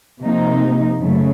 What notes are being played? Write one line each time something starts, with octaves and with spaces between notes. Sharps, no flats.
C3 F3 A#3 D#4
F#2 C#3 F#3 A3